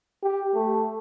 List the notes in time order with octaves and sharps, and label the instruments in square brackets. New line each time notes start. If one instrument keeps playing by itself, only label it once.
[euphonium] G4
A3